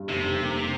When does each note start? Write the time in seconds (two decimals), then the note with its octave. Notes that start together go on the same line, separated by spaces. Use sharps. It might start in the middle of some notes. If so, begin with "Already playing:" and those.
Already playing: G2
0.09 F1 C3
0.24 F1
0.40 A#3